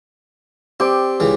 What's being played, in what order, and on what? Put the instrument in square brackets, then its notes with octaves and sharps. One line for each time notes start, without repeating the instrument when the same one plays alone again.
[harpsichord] C4 [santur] G4 D5
[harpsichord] C#2 C#3 E3